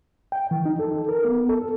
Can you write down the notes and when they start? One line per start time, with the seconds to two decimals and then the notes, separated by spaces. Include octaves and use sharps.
0.32 G5
0.51 E3
0.66 D#4
0.79 A4
1.09 A#4
1.25 B3
1.49 A4